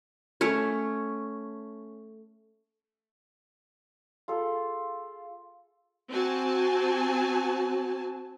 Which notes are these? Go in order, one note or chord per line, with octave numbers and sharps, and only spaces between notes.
A3 C#4 C#5
F4 G#4 A4
C4 F#4 G#5 A5